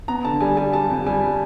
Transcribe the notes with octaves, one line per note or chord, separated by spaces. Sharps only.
B3 A#5
D3 A5
G3 G#5
G3 G#5
G3 A5
F2
G3 G#5